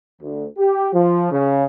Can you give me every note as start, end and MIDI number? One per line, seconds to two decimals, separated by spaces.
0.21 0.45 38
0.57 0.88 67
0.92 1.26 53
1.32 1.63 49